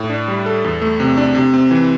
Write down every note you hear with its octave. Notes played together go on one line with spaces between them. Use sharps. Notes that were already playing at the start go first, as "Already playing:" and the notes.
Already playing: A2
D4
G3
A4
E2
A3
C3
D4
C3
C4
E3